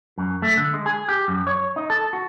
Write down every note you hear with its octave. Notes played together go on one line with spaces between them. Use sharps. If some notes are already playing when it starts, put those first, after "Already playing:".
F#2
A3
D3
G#3
G#4
G4
F#2
C#5
D#4
A4
F#4